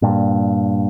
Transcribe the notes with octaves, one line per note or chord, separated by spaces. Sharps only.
G2 A#2